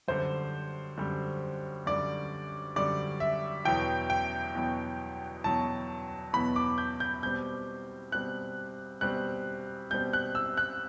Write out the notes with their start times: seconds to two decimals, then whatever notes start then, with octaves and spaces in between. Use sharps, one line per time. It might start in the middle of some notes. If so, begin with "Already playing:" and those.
0.08 F#2 D3 G3 C5
0.98 F#2 D3 G3
1.86 F#2 D3 G3 D5
2.76 F#2 D3 G3 D5
3.20 E5
3.65 E2 B2 F#3 B3 G5
4.10 G5
4.55 E2 B2 F#3 B3
5.44 E2 B2 F#3 B3 A5
6.33 E2 B2 F#3 B3 B5
6.56 D6
6.78 G6
7.00 G6
7.23 B2 G3 C4 G6
8.11 B2 G3 C4 F#6
9.01 B2 G3 C4 F#6
9.90 B2 G3 C4 G6
10.13 F#6
10.35 E6
10.57 F#6